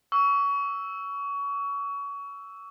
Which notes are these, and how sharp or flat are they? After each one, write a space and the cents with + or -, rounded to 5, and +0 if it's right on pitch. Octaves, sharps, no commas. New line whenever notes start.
C#6 +25 E6 +0